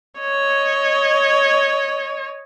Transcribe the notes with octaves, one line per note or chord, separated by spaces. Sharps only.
C#5 D#5